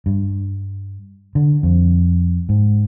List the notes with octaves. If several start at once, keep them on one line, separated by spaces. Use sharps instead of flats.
G2
D3
F2
G#2